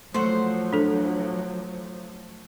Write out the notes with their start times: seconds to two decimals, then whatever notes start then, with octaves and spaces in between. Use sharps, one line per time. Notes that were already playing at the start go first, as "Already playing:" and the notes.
0.14 F3 F#3 A3 C5 F#5
0.73 D4 A4